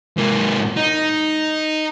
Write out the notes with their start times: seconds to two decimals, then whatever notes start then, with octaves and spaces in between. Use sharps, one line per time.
0.17 G#2 A#3
0.77 D#4